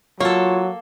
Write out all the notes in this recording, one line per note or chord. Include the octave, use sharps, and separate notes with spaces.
F#3 A#3 F4 A4 C#5